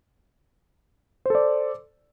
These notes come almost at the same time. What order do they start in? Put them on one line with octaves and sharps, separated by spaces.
C5 A4 D5